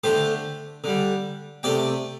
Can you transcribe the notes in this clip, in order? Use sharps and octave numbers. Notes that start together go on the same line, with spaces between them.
D3 A3 G4 C5
D3 G3
C3 A3 D5 G5